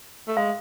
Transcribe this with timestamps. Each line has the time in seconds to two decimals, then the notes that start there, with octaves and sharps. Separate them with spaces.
0.28 A3
0.37 G#3 F5